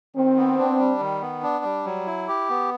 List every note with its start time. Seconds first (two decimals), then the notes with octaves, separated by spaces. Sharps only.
0.16 D#3 C4
0.37 B3
0.58 D4
0.79 G3
1.01 D#3
1.21 B3
1.43 D4
1.64 G3
1.85 F#3
2.07 E4
2.28 G4
2.49 B3